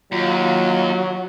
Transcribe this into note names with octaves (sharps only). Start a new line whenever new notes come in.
D#2 F#3 F4